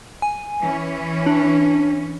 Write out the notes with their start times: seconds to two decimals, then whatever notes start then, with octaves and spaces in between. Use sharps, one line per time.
0.22 G#5
0.61 E3 C#4
1.26 D4